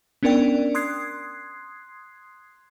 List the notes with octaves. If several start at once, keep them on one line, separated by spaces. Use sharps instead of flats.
B3 C#4 D4 A#4 D5 G5
C6 D#6 F#6 G#6 C7